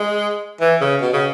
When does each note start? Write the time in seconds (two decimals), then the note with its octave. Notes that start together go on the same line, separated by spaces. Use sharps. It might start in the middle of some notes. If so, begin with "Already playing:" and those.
Already playing: G#3
0.60 E3
0.81 C#3
1.02 B2
1.13 C#3